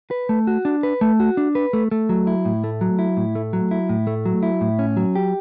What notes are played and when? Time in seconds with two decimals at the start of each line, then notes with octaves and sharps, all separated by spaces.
0.11 B4
0.29 A3
0.47 F#4
0.65 D4
0.83 B4
1.01 A3
1.20 F#4
1.37 D4
1.55 B4
1.73 A3
1.91 A3
2.09 F#3
2.27 E4
2.45 A2
2.64 A3
2.81 F#3
2.99 E4
3.17 A2
3.35 A3
3.53 F#3
3.71 E4
3.89 A2
4.07 A3
4.25 F#3
4.43 E4
4.61 A2
4.79 C#4
4.97 F#3
5.15 G4